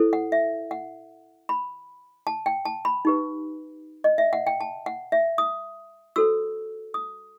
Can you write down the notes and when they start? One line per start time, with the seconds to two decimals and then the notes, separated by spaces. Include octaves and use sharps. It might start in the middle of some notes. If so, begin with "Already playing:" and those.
Already playing: E4 A4 C5
0.13 F#5
0.32 E5
0.71 F#5
1.49 B5
2.27 A5
2.46 G5
2.65 A5
2.85 B5
3.05 D#4 G4 B4
4.04 D#5
4.18 E5
4.33 F#5
4.47 G5
4.61 A5
4.86 F#5
5.12 E5
5.38 D#6
6.16 F#4 A4 C5 E6
6.94 D#6